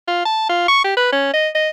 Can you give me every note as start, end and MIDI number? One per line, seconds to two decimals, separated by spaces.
0.08 0.25 65
0.26 0.49 81
0.50 0.66 65
0.68 0.79 85
0.84 0.96 67
0.97 1.12 71
1.13 1.31 61
1.34 1.49 75
1.55 1.70 75